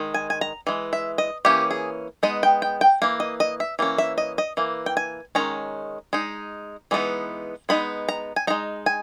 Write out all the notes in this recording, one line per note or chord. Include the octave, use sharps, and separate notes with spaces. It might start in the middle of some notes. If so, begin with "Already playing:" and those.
Already playing: D#3 G#3
G#5
G#5
A#5
E3 G#3
E5
D#5
E3 A#3 C#4 G4
G#4
G#3 B3 D#4 D#5
G5
G5
G5
E3 A#3
D#5
D#5
E5
E3 A#3 C#4
E5
D#5
D#5
E3 A#3
G5
G#5
D#3 G#3 C#4 A#5
G#3 D#4
E3 G#3 B3 D#4
G#3 B3 D#4 B5
A#5
G#5
G#3 D#4 A#5
G#5